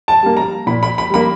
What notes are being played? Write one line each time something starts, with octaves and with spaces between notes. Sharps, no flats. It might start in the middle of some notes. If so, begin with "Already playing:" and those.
A5
G3 A#3
A#5
A#2 B5
B5
B5
G3 A#3 B5